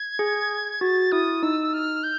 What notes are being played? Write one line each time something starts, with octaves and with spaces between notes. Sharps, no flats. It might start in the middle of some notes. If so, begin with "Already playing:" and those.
Already playing: G#6
G#4
F#4 A6
E4 D#6
D#4 E6
F6
G6